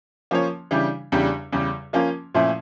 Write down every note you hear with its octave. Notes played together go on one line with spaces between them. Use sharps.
F3 A#3 C#4 F4 C#5
C#3 E3 G3 D4 G4
E2 C#3 G3 D4 G4
E2 C#3 G3
F3 A#3 C#4 F4
A#2 F3 A3 C#4 E4